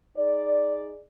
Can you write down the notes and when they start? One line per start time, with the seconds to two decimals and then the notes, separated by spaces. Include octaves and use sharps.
0.17 D#4 G#4 D5